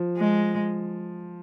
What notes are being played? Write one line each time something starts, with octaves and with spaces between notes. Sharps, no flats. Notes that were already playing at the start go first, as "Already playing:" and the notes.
Already playing: F3
G#3